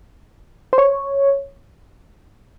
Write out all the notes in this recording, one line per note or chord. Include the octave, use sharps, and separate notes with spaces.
C5
C#5